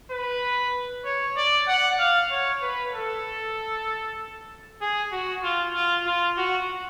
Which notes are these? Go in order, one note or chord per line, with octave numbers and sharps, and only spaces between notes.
B4
C#5
D5
F#5
F5
C#5
B4
A4
G#4
F#4
F4
F4
F4
F#4